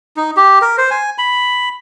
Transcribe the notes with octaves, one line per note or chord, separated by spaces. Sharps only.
D#4
G4
A#4
C5
G#5
B5